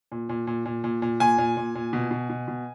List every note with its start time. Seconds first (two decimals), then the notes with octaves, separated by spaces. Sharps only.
0.12 A#2
0.29 A#2
0.47 A#2
0.65 A#2
0.84 A#2
1.02 A#2
1.20 A#2 G#5
1.38 A#2
1.57 A#2
1.75 A#2
1.93 B2
2.11 B2
2.30 B2
2.48 B2